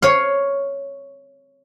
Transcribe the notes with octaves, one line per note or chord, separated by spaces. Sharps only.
C#5 F5